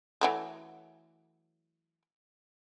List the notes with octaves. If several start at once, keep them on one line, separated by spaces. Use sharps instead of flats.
E3 F#3 A3